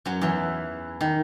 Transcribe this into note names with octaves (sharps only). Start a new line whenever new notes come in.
F#2 F#3
E2 E3
D#3